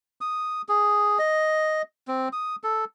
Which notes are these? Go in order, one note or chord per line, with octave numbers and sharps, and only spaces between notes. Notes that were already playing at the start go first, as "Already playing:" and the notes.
D#6
G#4
D#5
C4
D#6
A4